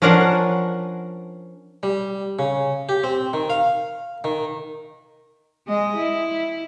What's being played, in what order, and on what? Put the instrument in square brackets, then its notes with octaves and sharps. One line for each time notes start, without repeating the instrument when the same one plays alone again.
[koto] F3 C#4 D4 A#4 F5 F#5
[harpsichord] G3
C#3
G4
C4
D#3
F5
D#3
[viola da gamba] G#3 D#5
E4